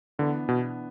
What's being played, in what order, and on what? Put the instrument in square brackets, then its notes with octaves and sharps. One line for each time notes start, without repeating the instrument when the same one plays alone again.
[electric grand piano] D3 [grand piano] E3 B3 D4
[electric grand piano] B2